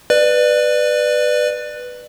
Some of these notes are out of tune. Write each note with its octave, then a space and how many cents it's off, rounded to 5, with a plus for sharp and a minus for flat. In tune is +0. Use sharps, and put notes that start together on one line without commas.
B4 +0 D5 +25